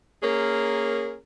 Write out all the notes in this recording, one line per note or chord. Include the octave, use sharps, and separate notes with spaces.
A#3 C#4 G#4 A#4